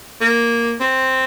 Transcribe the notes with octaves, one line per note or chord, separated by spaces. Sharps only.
A#3
C4